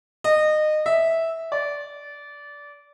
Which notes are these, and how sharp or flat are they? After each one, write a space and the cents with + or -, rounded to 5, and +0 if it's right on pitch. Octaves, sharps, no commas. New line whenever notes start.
D#5 -25
E5 -10
D5 -20